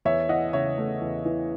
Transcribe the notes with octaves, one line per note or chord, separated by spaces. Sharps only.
E2 C#5 E5
E3 D#5 F#5
C#3 C#5 E5
A3
E2
E3